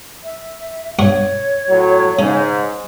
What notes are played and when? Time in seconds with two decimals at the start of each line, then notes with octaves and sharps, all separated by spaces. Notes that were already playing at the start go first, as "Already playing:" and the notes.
0.24 E5
0.99 G2 C#5 F#5 C#6
1.68 A2 F#3
2.19 G#2 C#3